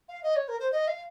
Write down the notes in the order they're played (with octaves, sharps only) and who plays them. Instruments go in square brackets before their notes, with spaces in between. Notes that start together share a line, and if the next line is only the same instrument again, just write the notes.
[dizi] F5
D#5
C#5
A#4
C5
D#5
F5